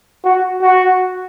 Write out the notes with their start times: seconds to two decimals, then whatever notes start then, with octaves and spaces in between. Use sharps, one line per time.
0.24 F#4
0.62 F#4